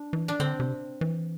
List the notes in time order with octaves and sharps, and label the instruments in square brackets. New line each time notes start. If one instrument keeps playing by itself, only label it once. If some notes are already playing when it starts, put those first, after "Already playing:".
Already playing: [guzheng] D4
[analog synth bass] E3
[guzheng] D4
[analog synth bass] D3 [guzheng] C4
[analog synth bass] C3
E3